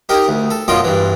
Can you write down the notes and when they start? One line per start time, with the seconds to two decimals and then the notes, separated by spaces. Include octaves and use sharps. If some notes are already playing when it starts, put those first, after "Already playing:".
0.09 D#4 G4 A#4
0.28 D2
0.50 A4
0.68 F#2 B2 F4 D#5 D6
0.84 G2 E3